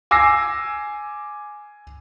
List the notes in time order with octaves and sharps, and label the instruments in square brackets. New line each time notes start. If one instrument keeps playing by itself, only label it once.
[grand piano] G#5 D6 E6 A#6 C7